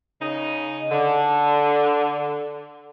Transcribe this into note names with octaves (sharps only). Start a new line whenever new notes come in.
C#3 D#4
D3